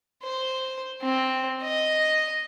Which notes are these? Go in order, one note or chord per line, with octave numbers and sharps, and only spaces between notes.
C5
C4
D#5